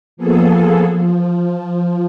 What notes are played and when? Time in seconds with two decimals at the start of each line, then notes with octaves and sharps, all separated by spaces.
0.17 F3 A#3 B3 G#4 A4
0.93 F3